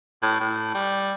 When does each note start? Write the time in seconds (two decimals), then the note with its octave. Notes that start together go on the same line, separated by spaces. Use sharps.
0.22 A2
0.40 A2
0.74 G3